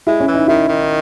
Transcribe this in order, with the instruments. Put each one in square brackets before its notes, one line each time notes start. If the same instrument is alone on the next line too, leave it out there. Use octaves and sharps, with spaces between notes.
[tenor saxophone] G#3 [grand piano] E4
[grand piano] C#4
[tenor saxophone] E3
[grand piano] D#4
[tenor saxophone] D#3 [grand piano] E4
[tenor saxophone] D#3